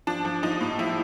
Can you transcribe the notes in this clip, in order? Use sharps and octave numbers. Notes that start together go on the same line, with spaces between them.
F3 D4
F3
F3 D#4
A2
F3 E4